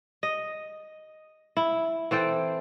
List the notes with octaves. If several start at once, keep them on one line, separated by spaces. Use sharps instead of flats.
D#5
E4
E3 C4 A4 G5